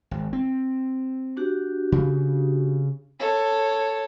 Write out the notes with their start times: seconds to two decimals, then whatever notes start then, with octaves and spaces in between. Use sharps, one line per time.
0.11 G#1
0.33 C4
1.37 D4 F#4 G4
1.92 C#3
3.20 A4 C#5